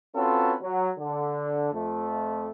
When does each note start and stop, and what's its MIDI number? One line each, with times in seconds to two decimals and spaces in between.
0.15 0.55 60
0.15 0.55 61
0.15 0.55 65
0.15 0.55 66
0.15 0.55 69
0.15 0.55 71
0.62 0.90 54
0.99 1.69 50
1.73 2.50 41
1.73 2.50 57